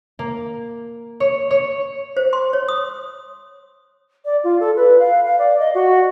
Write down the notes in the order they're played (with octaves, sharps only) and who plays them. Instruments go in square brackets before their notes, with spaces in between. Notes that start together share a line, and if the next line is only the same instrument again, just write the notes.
[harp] A#3
C#5
C#5
[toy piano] C5
C6
C#5
D#6
[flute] D5
F4
A4
B4
F5
F5
D5
D#5
F#4